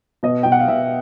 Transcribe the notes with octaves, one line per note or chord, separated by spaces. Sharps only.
B2 D#5
B2 G5
F#5
F5
B2 E5